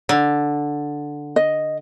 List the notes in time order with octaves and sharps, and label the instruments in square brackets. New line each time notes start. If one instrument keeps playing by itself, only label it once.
[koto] D3
[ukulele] D#5